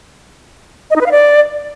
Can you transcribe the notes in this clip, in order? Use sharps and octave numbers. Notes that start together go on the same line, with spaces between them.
D#5
D#4
B4
F5
D5